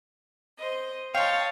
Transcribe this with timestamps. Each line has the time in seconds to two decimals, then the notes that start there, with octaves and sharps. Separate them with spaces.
0.58 C5 D#5
1.15 C#5 D#5 F5 G5 A5 C6